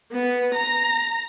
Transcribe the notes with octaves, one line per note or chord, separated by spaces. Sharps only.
B3
A#5